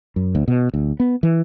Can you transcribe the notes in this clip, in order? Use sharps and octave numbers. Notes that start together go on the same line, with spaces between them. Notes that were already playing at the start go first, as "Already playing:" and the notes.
F#2
D2
B2
D2
B3
E3